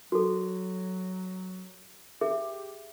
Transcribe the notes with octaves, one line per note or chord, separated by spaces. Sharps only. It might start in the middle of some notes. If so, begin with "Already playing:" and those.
F#3 F#4 A4
G4 G#4 E5